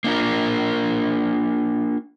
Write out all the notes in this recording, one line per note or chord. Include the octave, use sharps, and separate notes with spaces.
A#3 D4 F4 A#4